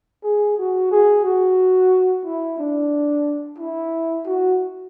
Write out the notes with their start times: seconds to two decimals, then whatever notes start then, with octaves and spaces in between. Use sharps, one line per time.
0.23 G#4
0.58 F#4
0.91 G#4
1.24 F#4
2.24 E4
2.58 D4
3.58 E4
4.26 F#4